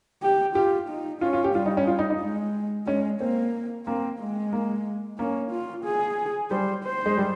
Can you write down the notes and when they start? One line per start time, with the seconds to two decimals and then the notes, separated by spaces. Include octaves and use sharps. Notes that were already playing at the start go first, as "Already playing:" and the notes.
0.23 G4
0.55 F4 G4
0.90 D#4
1.21 C#4 F4
1.33 F4
1.44 G4
1.55 G3 F4
1.66 D#4
1.77 C#4
1.87 F4
1.99 D#4
2.10 D#4
2.21 G#3
2.87 G#3 C#4
3.21 A#3 C4
3.86 A#3 C4
4.19 G#3
4.53 A#3
5.19 A#3 C#4
5.51 F4
5.85 G#4
6.51 G3 C5
6.84 C5
7.06 G#3
7.17 G3